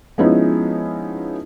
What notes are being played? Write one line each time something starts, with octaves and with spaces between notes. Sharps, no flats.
F3 G#3 B3 C#4 D#4 E4